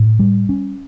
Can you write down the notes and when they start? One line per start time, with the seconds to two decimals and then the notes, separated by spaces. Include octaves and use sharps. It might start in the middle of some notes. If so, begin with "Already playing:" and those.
Already playing: A2
0.19 G3
0.49 C#4